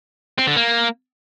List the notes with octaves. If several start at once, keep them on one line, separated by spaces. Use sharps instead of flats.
C4
D3
A#3